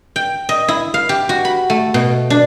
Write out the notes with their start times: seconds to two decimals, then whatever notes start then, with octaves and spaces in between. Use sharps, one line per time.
0.16 G5
0.49 D#5
0.68 E4
0.94 F5
1.09 G4
1.29 F#4
1.45 B5
1.70 A3
1.94 B2
2.30 D4